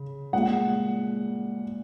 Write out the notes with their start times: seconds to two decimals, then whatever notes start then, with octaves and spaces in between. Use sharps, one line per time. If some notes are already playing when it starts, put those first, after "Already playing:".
Already playing: C#3
0.33 A#2 G#3 F#5